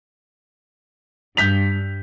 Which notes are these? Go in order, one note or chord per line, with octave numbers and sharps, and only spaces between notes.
G2 G6 B6 F7